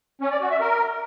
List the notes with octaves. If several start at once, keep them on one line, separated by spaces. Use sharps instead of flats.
C#4
D5
F#4
E5
A#4